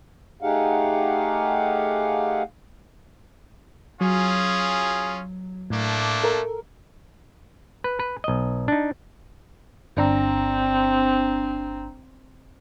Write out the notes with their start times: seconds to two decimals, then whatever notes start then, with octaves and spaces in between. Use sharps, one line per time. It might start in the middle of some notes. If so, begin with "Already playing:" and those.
0.42 A3 D#4 G4 G#4 F5 F#5
4.01 F#3 C#4 F4 G#4
5.70 A2 A3 A#3 D4
6.24 A4 A#4
7.84 B4
8.00 B4
8.24 B1 D#5
8.68 D4 D#4
9.97 G1 C4 D4 A#5